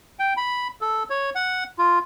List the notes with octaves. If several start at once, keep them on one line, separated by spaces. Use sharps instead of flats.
G5
B5
A4
C#5
F#5
F4